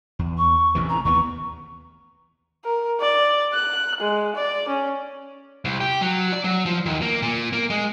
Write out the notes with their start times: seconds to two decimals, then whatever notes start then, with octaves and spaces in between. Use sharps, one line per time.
0.19 E2
0.38 C#6
0.75 A1 C3 E3
0.89 A#5
1.05 D#2 E3 B3 C#6
2.64 A#4
3.00 D5
3.53 F#6
4.00 G#3
4.36 D5
4.68 C#4
5.65 C2
5.81 G4
6.01 F#3
6.33 D5
6.44 F#3
6.66 F3
6.86 D#2
7.02 A#3
7.22 A#2
7.53 A#3
7.70 G#3